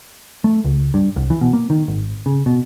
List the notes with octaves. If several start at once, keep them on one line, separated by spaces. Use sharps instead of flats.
A3
C#2
G2
C2
E3
B2
A#3
D#3
G#1
C#3
B2